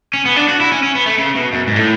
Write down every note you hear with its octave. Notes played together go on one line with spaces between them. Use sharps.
C#4
B3
D4
F#4
E4
C#4
C#4
B3
A3
C#3
B2
F#2
G#2
A2